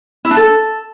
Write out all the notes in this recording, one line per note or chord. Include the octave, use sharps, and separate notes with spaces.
E4
D4
A4